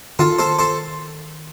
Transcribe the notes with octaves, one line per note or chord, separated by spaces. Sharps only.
D#3 F4 A4
A4 C5
A4 C5